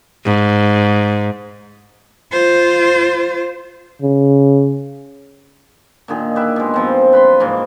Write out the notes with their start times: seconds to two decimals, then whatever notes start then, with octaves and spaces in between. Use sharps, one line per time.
0.24 G#2
2.32 F4 C5
4.02 C#3
6.08 A#2 D3 D#3 G#4
6.35 G4 B4 E5
6.56 B2 G#3
6.74 G2 F3 C4
7.13 B4 B5 C6
7.40 G#2 C3 E3 A#3